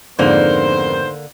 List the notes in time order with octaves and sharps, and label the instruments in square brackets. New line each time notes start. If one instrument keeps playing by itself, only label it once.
[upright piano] F2 G#2 F7 [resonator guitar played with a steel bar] D3 A#3 [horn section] D#3 B3 C5